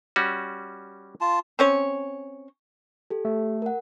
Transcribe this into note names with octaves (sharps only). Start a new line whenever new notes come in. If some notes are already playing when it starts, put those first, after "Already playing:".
G3 C#4 F#4
F4 A5
C4 C#4 C#5
G4 A4
A3
A#4 F#5